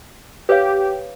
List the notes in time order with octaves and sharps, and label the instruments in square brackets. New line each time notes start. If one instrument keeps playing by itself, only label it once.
[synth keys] G4 [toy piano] B4 C#5 F5